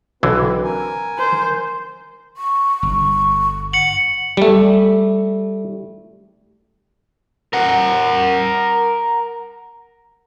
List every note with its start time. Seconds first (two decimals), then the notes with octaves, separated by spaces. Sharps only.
0.23 B1 D3 E3 C4 F#4 B4
0.63 A#4 G#5
1.19 C5
2.37 C#6
2.83 G1
3.73 F#5 C#7 F#7
4.37 G3 A3
7.53 A#4 F#5